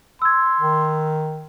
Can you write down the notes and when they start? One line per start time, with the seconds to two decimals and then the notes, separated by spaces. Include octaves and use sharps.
0.22 C6 E6 G#6
0.60 D#3